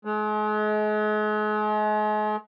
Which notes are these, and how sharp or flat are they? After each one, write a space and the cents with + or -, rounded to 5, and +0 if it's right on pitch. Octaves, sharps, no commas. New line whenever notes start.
G#3 +40